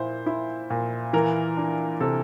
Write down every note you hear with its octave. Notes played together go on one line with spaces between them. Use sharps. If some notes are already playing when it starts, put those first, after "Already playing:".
Already playing: A#2 E4 C5
E4
A#2
E3 A#4
D4
C3 A4